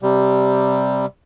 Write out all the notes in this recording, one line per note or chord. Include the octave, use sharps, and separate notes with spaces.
C3 G3